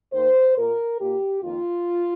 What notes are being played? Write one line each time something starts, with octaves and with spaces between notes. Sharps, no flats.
D#2 D#3 A#3 C5
A#2 A#3 A#4
A#2 A#3 G4
F2 D#3 A#3 F4